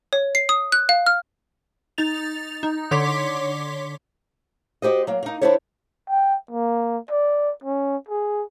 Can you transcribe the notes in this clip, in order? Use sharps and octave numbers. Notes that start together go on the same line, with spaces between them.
C#5
C7
D#6
F#6
F5
F6
D#4 A6 F7
D#4
D3 C#5 C6 D6 B6
F#4 G4 C5 D#5
F#3 A#3
A#3 D#4
D3 D4 E4 G4 C5 C#5
G5
A#3
D5
C#4
G#4